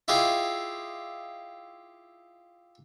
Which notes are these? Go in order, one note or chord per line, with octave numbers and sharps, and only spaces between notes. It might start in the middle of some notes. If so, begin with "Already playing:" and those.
E4 F4 G4 G#4 D#5